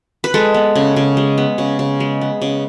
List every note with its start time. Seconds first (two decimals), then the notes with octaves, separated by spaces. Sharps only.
0.24 B4
0.34 G#3 A4
0.54 B3
0.75 C#3
0.96 C#3
1.17 G#3
1.38 B3
1.58 C#3
1.79 C#3
2.00 G#3
2.21 B3
2.42 C#3